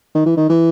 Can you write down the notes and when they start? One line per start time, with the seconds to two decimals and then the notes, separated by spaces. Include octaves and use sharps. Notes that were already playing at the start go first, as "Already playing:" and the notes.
0.15 D#3
0.26 E3
0.37 D#3
0.49 E3